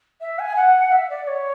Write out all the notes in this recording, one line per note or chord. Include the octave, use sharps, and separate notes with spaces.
E5
G#5
F#5
E5
D5
C#5